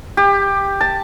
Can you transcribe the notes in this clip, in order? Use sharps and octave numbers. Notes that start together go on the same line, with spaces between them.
G4
A5